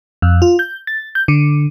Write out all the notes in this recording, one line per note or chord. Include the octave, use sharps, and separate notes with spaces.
F2
F4
G6
A6
G6
D3